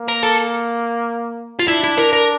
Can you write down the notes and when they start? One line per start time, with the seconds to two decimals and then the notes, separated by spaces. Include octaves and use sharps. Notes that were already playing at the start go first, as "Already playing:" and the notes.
Already playing: A#3
0.08 A#4
0.23 A4
1.59 F4
1.68 D4 E4
1.84 E4
1.97 A#4
2.13 A#4